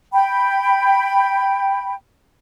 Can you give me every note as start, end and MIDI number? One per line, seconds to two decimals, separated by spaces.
0.13 1.93 79
0.13 1.93 83